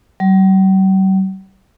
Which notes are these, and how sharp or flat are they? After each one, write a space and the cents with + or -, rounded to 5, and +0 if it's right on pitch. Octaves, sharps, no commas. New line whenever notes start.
G3 -45